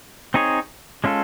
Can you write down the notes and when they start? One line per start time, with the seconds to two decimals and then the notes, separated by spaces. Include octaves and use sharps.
0.34 C4 D#4 G#4 C#5
1.04 G#3 C#4 F4 A4